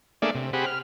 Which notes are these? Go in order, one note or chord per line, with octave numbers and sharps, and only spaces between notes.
A3 A#3 D4 G#4 D5 E5
C3
C4 G4 G#4 F#5 B5
F6